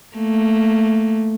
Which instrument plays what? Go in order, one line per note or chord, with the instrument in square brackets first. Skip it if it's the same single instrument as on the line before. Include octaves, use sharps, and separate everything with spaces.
[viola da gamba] A3 A#3